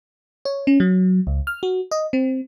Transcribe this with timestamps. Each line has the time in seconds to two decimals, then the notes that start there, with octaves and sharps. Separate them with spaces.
0.45 C#5
0.67 C#4
0.80 F#3
1.27 C#2
1.47 F6
1.63 F#4
1.91 D#5
2.13 C4